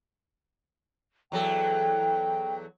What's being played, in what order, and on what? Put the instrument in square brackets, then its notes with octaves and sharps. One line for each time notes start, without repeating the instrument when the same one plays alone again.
[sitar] E2 F#3 A4 [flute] G5